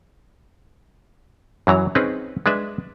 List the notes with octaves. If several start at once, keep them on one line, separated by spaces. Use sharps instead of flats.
F#2 E3 F#3 A#5
C4 C#4 D#4 G#4 B4
G#3 D4 B4 E5